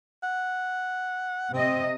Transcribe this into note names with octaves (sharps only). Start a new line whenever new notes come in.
F#5
C3 C4 D#5